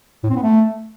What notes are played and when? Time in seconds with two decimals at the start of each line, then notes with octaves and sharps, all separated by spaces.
0.23 A2
0.30 C4
0.36 B3
0.43 A3